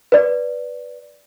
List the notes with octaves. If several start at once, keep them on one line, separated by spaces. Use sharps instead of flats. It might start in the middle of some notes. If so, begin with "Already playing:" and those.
B4 D5